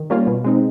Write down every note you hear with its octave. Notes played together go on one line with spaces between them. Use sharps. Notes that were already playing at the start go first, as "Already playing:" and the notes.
Already playing: D#3
G3 A#3 C#4 F4
B2
G#3 C4 D#4